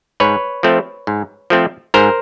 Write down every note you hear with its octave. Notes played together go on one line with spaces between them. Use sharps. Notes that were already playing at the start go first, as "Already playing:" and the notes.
G#2 B4 C#5
F3 A3 C4
G#2
F3 A3 C4
G#2 A#4 C5